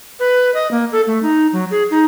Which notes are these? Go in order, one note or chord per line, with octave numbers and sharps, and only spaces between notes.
B4
D#5
A#3
A4
A3
D#4
F#3
G#4
D#4